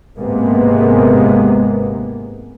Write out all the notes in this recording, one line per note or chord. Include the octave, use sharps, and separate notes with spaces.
G#1 C3 G#3 A#3 B3